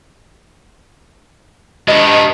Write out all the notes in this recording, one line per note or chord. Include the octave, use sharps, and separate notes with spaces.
D#3 B3 G4 B4 D#5